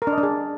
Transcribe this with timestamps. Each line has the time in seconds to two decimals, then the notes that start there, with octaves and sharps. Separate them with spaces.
0.02 A#4
0.07 D4
0.12 D#5
0.18 D4
0.23 G#4